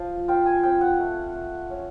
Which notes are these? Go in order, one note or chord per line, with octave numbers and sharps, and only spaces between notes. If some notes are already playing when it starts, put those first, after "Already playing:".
Already playing: F3
F4 G5
G#5
C4 G5
F#5
A3
A3
C#4